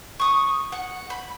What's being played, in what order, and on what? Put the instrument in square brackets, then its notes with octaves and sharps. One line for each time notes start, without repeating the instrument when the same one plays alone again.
[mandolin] C#6 D#6
F#5
B5